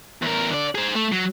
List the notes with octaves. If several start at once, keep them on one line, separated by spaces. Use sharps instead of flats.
E2 A#4
D3 D5
G#4 C5
A3
F#3